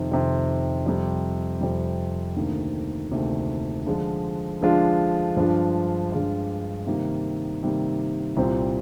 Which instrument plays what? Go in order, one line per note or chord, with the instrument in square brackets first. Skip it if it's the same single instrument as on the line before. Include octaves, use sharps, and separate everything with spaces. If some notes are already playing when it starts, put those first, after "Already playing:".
Already playing: [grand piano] F2 C3 D#3
F2 C3 D#3
F2 C3 G3
F2 C3 G3
D2 C3 D#3 A#3 D4
D2 C3 D#3 A#3 D4
D3 F3 G#3 D4 F4
D3 F3 G#3 D4 F4
G2 F3 G#3 D4 F4
G2 F3 G#3 D4 F4
C3 D#3 G3 A#3
C3 D#3 G3 A#3
C2 A#2 G3 C4